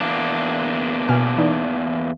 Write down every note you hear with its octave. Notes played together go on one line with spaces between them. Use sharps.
E2 A#3 D4
B2 G#5 F6
E3 D#4 D5